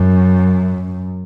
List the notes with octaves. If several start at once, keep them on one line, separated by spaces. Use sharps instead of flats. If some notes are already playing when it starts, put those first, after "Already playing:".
Already playing: F#2